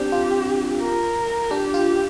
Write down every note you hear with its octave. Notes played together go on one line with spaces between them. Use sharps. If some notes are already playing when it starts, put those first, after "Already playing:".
Already playing: C4 D4 G4
F4
A#4
D4 G4
F4